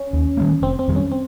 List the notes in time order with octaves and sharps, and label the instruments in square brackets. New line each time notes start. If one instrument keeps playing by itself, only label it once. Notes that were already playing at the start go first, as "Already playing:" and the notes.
Already playing: [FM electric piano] C#4
[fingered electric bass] D#2
D#3 G3 A#3
[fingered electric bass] F1 [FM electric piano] C4
[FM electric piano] C4
[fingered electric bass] F2 D#3 G3
[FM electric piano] C#4
C4